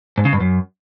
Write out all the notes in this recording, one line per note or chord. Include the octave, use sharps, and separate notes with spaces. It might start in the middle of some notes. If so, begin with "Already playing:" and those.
G#2
C#3
G2
F#2